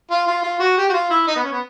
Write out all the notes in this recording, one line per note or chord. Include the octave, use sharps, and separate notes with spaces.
F4
F4
F4
F#4
G4
F#4
F4
E4
D#4
B3
C#4
B3